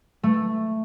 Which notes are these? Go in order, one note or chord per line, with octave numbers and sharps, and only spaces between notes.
A3